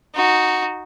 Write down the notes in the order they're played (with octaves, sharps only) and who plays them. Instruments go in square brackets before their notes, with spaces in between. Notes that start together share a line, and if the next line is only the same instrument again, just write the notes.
[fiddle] D#4 F#4